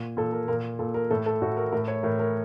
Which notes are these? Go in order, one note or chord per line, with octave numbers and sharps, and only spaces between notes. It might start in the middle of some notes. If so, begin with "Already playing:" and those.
Already playing: A#2
A#2 A4
A#4
A#2 A#4
A#2 A4
A#4
A2 A4
A4
A2 F#4
A#4
A2 A#4
C#5
A2 A#4
A#4